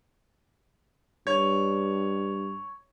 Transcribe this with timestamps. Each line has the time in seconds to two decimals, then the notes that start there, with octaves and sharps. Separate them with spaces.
1.27 G2 C#5